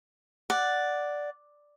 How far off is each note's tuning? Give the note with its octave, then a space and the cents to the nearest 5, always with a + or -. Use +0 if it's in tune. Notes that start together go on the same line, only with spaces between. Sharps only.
D5 +0 F#5 +0